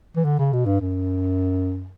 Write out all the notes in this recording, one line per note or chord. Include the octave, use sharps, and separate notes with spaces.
E3
D3
C#3
B2
G2
F#2